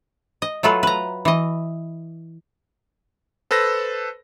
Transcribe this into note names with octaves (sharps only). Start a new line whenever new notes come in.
D#5
F#3 A3 F4 A4 B4
B4 A#5
E3 D#5
A4 B4 C5 E6 A#6